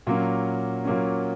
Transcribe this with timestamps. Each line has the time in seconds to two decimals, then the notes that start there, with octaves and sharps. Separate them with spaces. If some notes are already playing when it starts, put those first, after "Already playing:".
0.07 A#2 F#3 A#3 C#4
0.85 A#2 F#3 A#3 C#4